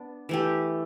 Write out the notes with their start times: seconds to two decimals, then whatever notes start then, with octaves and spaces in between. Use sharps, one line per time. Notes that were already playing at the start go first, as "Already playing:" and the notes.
Already playing: B3 D4
0.29 E3 A3 G4